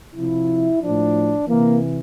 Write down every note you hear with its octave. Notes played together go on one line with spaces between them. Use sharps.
C3 F3 E4
A2 F3 D4
C3 E3 A#3